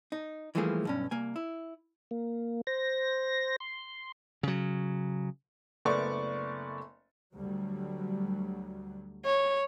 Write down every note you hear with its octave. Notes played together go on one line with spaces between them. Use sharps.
D#4
E3 F3 G3 A3 A#3 G#4
B1 G2 C#4
C2 A#3 G#5
E4
A#3
C5 A#6
C6
C#3 F#3
F#1 A3 B3 D5 C#6
D2 F#3 G3
C#5